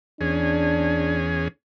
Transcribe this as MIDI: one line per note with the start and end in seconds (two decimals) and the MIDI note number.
0.21 1.48 40
0.21 1.48 61
0.21 1.20 62
0.21 1.48 68